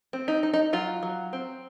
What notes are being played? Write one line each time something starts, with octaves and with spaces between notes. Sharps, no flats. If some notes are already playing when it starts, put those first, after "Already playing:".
C4
D#4
D#4
D#4
F#3 F4
F#3
C4